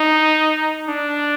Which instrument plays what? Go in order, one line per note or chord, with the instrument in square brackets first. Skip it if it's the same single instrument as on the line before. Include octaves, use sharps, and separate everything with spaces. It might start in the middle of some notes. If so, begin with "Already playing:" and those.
Already playing: [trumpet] D#4
D4